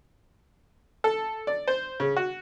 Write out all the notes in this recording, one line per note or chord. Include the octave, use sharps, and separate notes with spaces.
A4
D5
C5
C#3
F#4